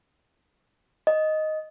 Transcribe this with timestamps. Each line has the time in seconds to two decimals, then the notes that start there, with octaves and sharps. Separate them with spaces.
1.07 D#5